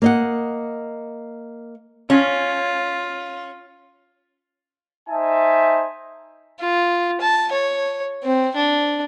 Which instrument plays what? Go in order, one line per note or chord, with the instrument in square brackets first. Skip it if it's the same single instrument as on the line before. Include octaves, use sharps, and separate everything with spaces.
[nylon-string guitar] A#3 D#5 F#5
[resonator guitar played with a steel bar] C#4 [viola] F4
[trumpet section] D#4 C5 E5 G#5 A5
[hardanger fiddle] F4
A5
C#5
C4
D4